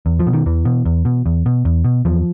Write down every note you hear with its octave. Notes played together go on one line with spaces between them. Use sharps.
E2
F3
B2
D#3
E2 E3
B2
E2
B2
E2
B2
E2
B2
E2 F3